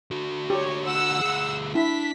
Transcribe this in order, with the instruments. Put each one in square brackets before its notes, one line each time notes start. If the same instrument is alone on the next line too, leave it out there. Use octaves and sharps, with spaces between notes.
[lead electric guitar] D3 F#4
[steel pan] G4 [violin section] C#5
[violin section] F#5 E6
[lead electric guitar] D2 G#4
[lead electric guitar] D4 [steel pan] E4 [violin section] B6